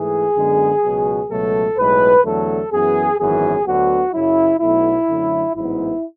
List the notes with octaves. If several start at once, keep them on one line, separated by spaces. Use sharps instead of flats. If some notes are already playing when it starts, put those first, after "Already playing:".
Already playing: G#2 E3 A3 G#4
F#2 D3 G#3 B3
C#2 B2 F#3
C#2 B2 F#3 A3 A4
B1 A2 G#3 B4
E2 D3 F#3 A3 A4
F#2 E3 B3 G#4
G#1 F#2 E3 B3 G#4
D2 D3 F#3 B3 F#4
F#2 C#3 F#3 E4
B1 B2 F#3 A3 E4
F#2 D3 F#3 A3
A1 G#2 F#3 B3 E4